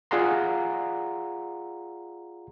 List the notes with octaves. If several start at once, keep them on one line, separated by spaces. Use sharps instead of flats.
F4 G#4 D5 F#5 A#5 C6